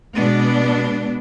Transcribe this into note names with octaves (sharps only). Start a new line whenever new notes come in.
B2 G#3 B3 D4